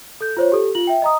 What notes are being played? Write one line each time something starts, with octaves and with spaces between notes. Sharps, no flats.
A4 G6
F4 C5 C#5
G4 A4
F4 F#7
E5 G5
D#5 A#5 D#6